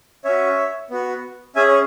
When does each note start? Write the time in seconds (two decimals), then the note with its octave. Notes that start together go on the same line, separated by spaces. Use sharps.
0.25 C#4 F#4 C#5 E5
0.90 B3 F#4
1.56 C#4 G#4 E5 G#5
1.68 C#5